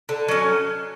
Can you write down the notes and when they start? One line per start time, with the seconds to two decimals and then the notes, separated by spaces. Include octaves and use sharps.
0.09 D3
0.28 F#3 C#4